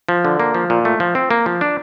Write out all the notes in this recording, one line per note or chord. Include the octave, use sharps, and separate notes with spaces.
F3
D3
A#3
F3
A#2
A3
F3
C4
A#3
F3
D4